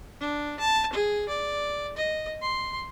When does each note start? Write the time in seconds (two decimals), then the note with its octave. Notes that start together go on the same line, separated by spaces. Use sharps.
0.20 D4
0.59 A5
0.93 G#4
1.28 D5
1.97 D#5
2.42 C6